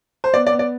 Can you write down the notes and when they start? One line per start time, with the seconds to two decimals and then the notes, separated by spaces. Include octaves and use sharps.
0.24 C5
0.34 B3 D5
0.47 D5
0.52 B3
0.59 D5